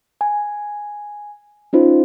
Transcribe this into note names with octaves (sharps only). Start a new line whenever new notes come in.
G#5
C#4 D#4 F4 C5